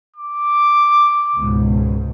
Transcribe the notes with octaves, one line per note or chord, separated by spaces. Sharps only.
D6
C#2 G#2 B2